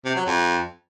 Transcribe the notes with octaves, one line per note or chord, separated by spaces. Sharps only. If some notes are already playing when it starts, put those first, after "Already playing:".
C3
F#3
F2